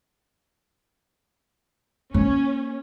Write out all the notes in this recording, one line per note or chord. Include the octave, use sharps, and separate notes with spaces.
A#3 C#4